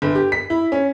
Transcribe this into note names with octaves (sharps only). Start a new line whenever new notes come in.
G1
G4
B6
E4
C#4